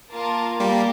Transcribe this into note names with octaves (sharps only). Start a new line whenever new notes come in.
A#3 F4 A#4 F5 A5
G3 A#3 G4 A#4 F5 A5